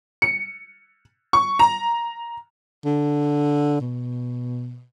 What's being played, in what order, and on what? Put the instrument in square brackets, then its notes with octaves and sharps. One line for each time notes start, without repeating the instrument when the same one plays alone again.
[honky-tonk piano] C#7
C#6
A#5
[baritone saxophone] D3
B2